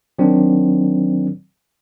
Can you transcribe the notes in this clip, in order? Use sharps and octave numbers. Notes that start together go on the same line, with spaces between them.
D#3 F#3 C4 D4